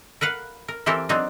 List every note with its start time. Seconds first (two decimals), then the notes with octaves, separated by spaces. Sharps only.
0.21 A#4 B4 F5 F#5
0.68 A#4
0.86 E3 C4 G4 A4 A#4
1.09 F#3 C4 D4 D#4